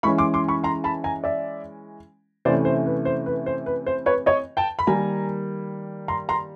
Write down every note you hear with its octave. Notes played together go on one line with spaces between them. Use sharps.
E3 G#3 C#4 B5 C#6
C6 D6
C6 D6
B5 C#6
A#5 C6
A5 B5
G#5 A#5
D5 E5
C3 E3 A3 C#4 C5 D5
C5
B4
C5
B4
C5
B4
C5
B4 C#5
C#5 D#5
G5 A5
B5
D#3 G3 A#3 G#5 A#5
A#5 C6
A#5 C6